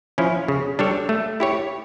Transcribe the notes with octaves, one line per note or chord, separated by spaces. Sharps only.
F3 C#4 E4
C#3
G3 D4 A4 C#5
A3
E4 G4 C#5